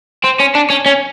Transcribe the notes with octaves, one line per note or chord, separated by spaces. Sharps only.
C4
C#4
D4
C#4
C#4